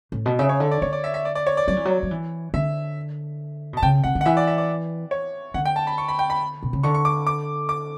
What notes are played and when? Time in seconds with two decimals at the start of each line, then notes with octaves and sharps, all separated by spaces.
0.12 A2
0.26 B2
0.39 C#3 E5
0.49 C#5
0.60 D3
0.71 D5
0.82 D3 C#5
0.93 D5
1.04 E5
1.14 E5
1.25 D5
1.35 D5
1.46 C#5
1.57 D5
1.68 F#3 D5
1.77 E3
1.85 F#3
2.03 F#3
2.11 E3
2.54 D3 E5
3.73 B2
3.77 A5
3.82 C#3 G5
4.04 C#3 F#5
4.15 D3
4.21 F#5
4.26 E3 E5
4.37 D5
4.47 E5
4.58 D5
5.11 C#5
5.54 D3 F#5
5.65 G5
5.76 A5
5.87 B5
5.98 C#6
6.08 B5
6.19 G5
6.30 B5
6.63 B2
6.73 C#3
6.83 D3 C#6
6.94 C#6
7.05 D6
7.27 D6
7.69 D6